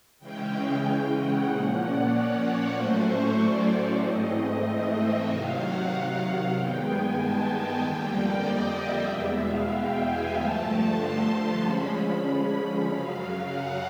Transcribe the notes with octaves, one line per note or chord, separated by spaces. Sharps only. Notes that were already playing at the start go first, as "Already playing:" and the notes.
C#3 E3 G#3 C#4 G5
G5
F#5
A#2 F3 A#3 C#4
D5
C#5
C#5
A2 F#3 A3 C#4 C5
C#5
D5
G#2 E3 A3 C4 D#5
E5
C3 D#3 F#3 F5
F#5
F#5
G2 D#3 G#3 B3 G5
G#5
A5
A5
F2 D3 G3 A#3 G5
D5
D#5
E5
E2 B2 G#3 B3
F5
G5
G#5
G2 D3 F3 A3 A5
C6
C6
D3 F3 G#3 C#4 B5
B5
F#2 C#3 F#3 F5
F#5